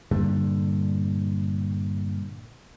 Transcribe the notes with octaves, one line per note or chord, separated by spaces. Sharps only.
G2 A#2 D3 G3